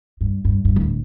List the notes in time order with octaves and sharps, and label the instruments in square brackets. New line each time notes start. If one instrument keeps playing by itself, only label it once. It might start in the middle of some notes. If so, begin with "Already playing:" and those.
[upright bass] G2
G2
G2
D1